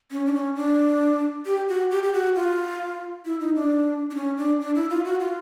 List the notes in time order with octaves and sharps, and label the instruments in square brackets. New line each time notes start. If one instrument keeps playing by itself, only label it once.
[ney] C#4
D4
C#4
D4
G4
F#4
G4
G4
F#4
F4
E4
D#4
D4
D4
C#4
D4
D4
E4
F4
F#4
F4